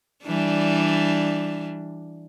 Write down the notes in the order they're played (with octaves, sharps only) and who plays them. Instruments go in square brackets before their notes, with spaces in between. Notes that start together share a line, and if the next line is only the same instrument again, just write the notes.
[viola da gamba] E3 G3 D4